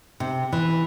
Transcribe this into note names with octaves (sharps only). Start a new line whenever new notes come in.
C3
E3